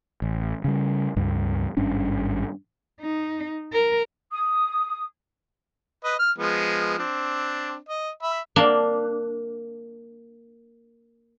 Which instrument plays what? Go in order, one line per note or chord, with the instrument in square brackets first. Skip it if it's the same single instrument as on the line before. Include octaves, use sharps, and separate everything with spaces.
[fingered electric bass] A1
C#3 G3
C#2 G2
G#1 G2 C#4 D4
[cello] D#4
A#4
[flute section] D#6
[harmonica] B4 D#5
F6
F3 G#3 B3
C4 D4
D#5
E5 B5
[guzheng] A#3 D4